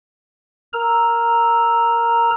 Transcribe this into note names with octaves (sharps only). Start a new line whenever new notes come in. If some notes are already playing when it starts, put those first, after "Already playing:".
A#4 A#5 E6